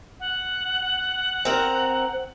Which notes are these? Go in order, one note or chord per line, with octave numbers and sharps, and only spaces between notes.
F#5
C4 A#4